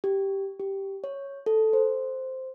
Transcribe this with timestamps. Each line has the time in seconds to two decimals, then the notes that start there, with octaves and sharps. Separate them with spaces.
0.04 G4
0.60 G4
1.04 C#5
1.46 A4
1.73 C5